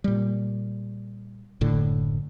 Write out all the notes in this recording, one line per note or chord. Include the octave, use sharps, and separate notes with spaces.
A#2 G3
F#1 A2 D3